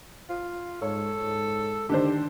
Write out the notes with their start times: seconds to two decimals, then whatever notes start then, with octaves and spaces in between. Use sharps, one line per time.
0.30 F4
0.82 G#2 A4 C#5
1.22 G#2
1.89 D3 D#3 D4 G4 C5